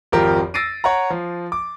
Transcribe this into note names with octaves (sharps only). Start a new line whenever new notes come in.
G#1 F2 F3 G4 A#4
E6 A6 A#6 C7 D7 D#7
C#5 F#5 A#5
F3
D6